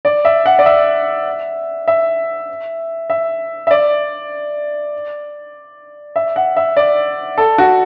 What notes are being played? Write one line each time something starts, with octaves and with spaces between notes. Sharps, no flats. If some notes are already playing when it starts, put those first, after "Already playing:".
D5
E5
F#5
D5
E5
E5
E5
E5
D5
E5
F#5
E5
D5
A4
F#4